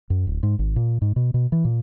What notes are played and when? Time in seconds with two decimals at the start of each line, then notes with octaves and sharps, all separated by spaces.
0.10 F#2
0.27 D1
0.43 G#2
0.59 G#1
0.76 A#2
1.02 G#2
1.16 B2
1.34 B2
1.52 E3
1.65 A#2